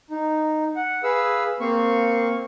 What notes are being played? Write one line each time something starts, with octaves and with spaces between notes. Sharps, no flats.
D#4
F#5
G#4 B4 F5 E6
A#3 C4 F5 C#6